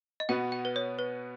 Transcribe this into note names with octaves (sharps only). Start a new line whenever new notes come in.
D#5
B2 B3 F#4 B4 F#5
F#5
B4
C#5
B4